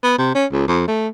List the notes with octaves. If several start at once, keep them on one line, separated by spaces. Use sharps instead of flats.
B3
C3
C#4
C#2
F2
A3